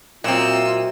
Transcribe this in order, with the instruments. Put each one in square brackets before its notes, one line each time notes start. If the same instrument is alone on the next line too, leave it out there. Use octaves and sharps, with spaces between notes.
[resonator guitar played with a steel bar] A#2 C4 [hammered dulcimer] F#3 E5 [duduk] F4 [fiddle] D#5 E6